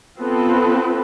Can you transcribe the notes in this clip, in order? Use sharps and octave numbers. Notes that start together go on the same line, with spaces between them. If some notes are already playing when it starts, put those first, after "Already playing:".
B3 C4 F4 A4 B4